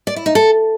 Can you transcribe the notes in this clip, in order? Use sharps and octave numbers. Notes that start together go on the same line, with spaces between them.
D5
E4
D#4
A4